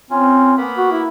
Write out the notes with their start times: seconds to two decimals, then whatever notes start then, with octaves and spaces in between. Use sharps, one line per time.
0.11 C4 C#4 F4
0.57 A#3 B3 B5
0.78 F#4
0.91 E4